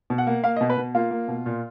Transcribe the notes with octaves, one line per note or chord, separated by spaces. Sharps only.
B2
F#5
A#3
A#3 F5
D#5
B2
B4
B2
A#3 F4
A#3
B2
A#2